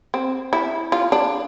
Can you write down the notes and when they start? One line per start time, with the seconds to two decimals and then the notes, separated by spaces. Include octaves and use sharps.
0.14 C4
0.53 E4
0.92 F4
1.12 D4